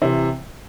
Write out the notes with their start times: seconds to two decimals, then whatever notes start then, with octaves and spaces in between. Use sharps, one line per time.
0.01 C3 E3